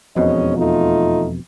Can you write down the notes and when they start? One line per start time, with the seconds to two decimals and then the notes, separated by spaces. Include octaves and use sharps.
0.16 E1 F2 G#2 B2 C#4 D#5
0.56 A3 D#4 F4